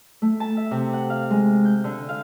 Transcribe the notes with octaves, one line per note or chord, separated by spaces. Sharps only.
A3
A5
E5
C3
F#5
F5
G#3
G6
D3
F5